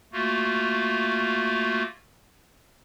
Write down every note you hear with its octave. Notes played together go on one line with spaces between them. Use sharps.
A3 A#3 F4 F#4